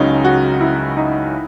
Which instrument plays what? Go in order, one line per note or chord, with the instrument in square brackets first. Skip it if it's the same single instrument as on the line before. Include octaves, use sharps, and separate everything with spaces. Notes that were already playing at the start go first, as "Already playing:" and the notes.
Already playing: [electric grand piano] C#2 C#3 F#3 C#4 [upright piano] D#4
[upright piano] F#4
E4
D#4